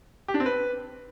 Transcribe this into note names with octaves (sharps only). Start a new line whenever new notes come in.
G4
D4
C4
B4